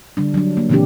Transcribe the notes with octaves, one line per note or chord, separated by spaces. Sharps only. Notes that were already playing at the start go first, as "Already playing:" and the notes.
D3 G3 D4
F#3 D4
A#3
A#2 C#3 E3 C4 D4 G4